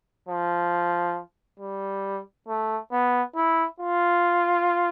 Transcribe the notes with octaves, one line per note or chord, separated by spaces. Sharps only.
F3
G3
A3
B3
E4
F4